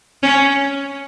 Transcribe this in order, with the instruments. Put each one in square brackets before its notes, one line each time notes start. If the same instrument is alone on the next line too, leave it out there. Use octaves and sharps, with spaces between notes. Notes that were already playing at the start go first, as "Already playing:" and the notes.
[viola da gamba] C#4